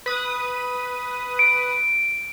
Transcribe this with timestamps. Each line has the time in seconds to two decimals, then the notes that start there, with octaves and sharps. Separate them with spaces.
0.06 B4 D#6
1.39 D7